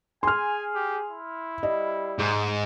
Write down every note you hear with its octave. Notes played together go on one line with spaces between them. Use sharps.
G#4 G#5 C6 F6
G4
E4
G3 D#5
G#2